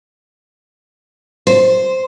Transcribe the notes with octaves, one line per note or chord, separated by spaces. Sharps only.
C5